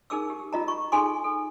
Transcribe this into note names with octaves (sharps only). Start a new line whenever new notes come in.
D#4 G#4 A#4 D6 E6
G4
F4 D#5 A#5
C#6
D#4 G#4 A4 G#5 C6 D6
A4